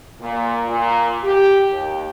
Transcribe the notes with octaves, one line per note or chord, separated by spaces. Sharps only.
A#2
A#2
G4
D#2